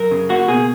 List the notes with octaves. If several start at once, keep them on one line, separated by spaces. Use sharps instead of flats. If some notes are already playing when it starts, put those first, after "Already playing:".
Already playing: F#2 A#4
C#3
A#3 F#4
B2 G#4